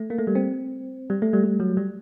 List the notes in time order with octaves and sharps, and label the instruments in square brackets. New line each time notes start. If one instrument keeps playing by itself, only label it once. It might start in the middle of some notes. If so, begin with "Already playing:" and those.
Already playing: [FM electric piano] A3
A#3
A3
G3
C4
G3
A3
G3
G3
F#3
G3